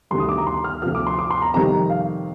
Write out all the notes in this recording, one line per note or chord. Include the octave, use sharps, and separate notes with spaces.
D2 C3 D#3 G3 C6
D#6
D6
A#5
C6
F6
D2 C3 F3 F6
D6
C6
D6
C6
A#5
F2 C3 D#3 G3 A#5
F5